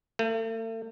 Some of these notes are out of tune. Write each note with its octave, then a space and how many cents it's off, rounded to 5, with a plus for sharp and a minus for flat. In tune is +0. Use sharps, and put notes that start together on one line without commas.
A3 +40